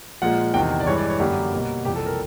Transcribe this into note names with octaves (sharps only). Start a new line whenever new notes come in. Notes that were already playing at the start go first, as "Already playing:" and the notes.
A#2 F3 G#3 F#5
E2 C3 D#3 G5
D5
G2 E3 G#3 C#5
D5
C#5
F#2 D3 G3 A#3 G4
B2 G3 A#3
F2 C3 E3 G3 G4
A4
A#4